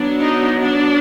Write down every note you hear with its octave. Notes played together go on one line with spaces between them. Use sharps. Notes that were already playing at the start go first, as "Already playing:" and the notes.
Already playing: F#3 B3 D4
D#4
D4